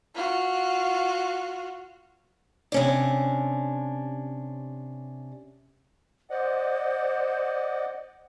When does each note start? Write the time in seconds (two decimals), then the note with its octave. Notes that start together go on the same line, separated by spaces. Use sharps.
0.15 F4 F#4
2.72 C3 C#4 D4
6.30 C5 D5 D#5 F#5